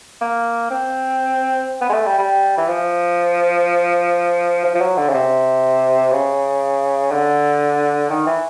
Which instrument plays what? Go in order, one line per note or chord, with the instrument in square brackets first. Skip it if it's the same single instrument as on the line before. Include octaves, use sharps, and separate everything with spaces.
[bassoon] A#3
C4
B3
G#3
A3
G3
G3
E3
F3
F3
F3
F#3
D3
C#3
C3
C#3
D3
D#3
E3